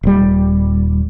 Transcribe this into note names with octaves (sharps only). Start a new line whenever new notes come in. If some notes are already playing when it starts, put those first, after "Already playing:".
D#1 G3